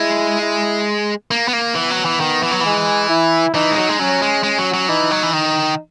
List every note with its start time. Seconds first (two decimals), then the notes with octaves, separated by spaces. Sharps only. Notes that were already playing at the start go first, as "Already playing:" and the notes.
Already playing: G#3 E4
0.42 E4
1.31 A#3
1.48 B3
1.53 A#3
1.75 E3 B3
1.91 F#3
2.05 E3
2.20 D#3
2.43 E3
2.51 F#3
2.61 E3 G#3
3.09 E4
3.54 E3 D#4
3.71 G#3
3.77 F#3
3.89 G#3
3.99 F#3 C#4
4.22 G#3
4.43 G#3 C#4
4.58 F#3
4.74 F#3
4.88 E3 D#4
5.11 F#3
5.23 E3
5.33 D#3 D#4